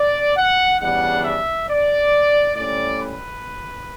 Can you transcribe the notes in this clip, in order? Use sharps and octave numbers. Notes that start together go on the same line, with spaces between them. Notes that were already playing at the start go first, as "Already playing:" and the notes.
Already playing: D5
F#5
E2 C#3 G3 D4 F#5
E5
D5
A2 G3 C#4 D5
B4